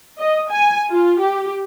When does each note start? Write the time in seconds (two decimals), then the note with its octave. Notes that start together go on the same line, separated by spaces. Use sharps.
0.19 D#5
0.51 G#5
0.90 F4
1.20 G4